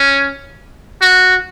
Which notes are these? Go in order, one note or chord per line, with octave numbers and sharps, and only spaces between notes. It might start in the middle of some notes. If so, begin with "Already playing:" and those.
Already playing: C#4
F#4